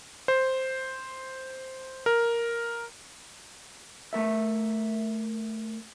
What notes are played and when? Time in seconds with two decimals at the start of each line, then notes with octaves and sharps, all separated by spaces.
0.28 C5
2.06 A#4
4.13 A3 A#4 E5